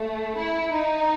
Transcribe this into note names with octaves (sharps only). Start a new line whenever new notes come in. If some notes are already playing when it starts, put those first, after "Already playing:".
Already playing: A3
E4
D#4